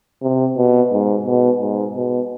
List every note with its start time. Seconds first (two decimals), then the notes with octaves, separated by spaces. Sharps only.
0.22 C3
0.57 B2
0.92 G#2
1.26 B2
1.61 G#2
1.96 B2